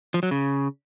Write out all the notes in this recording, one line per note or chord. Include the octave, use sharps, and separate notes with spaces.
F3
F#3
C#3